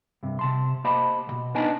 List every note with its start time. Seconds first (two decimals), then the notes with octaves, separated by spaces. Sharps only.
0.23 G2 C3
0.39 C3 A5 C6
0.84 A#3 G4 C5 D#5 A5 B5
1.27 C2 B2
1.55 B3 D4 D#4 D#5 G#5 A5